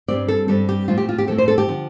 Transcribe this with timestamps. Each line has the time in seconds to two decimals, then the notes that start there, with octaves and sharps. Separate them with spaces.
0.08 G2 G3 C4 D5
0.28 A4
0.48 G2 G3 C4 A4
0.69 G4
0.88 A2 F3 C4 F4
0.98 G4
1.09 F4
1.18 G4
1.27 A2 F3 C4 A4
1.38 C5
1.48 A4
1.58 G4
1.68 D3 F3